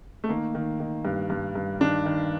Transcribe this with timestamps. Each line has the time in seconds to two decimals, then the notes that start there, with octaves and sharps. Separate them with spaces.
0.24 A3
0.29 D#3 A#3
0.55 D#3
0.80 D#3
1.05 G2
1.30 G2
1.55 G2
1.80 D#3 D4
2.06 D#3